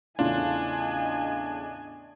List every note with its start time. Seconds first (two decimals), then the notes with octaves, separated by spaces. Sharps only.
0.19 E2 A2 C#3 D4 F4 D#5 G#5